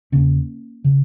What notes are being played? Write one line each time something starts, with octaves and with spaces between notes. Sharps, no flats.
E2 C#3 A#3 C#4
C#3